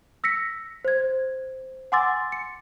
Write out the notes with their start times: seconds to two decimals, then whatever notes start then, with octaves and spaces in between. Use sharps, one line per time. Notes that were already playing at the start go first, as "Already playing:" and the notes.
0.24 E6 A#6 B6 C#7
0.85 C5 G#6
1.92 F#5 G#5 C6 D6 E6 A6
2.32 C#7